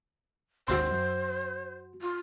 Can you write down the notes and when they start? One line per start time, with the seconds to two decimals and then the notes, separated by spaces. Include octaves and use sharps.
0.68 G#1 D#2 D#3 F#4 C5 C6
0.91 F#2
2.01 F4